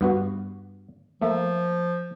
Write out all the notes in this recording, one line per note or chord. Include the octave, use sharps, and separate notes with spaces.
G2 B3 F#4
F3 A3 A#3 E5